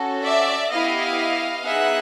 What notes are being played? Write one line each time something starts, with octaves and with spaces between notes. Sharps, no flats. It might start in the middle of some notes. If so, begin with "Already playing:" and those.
Already playing: C#4 F#4 A4
D5 E5
B3 E4 G4 D#5 F5
B3 D#4 G#4 E5 F#5